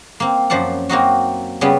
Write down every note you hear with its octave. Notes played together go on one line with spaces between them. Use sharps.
A#3 C4
F#2 F3 C5 D5 F#5
A#3 C4 D#4 F#4
C#3 G3 B3 C#4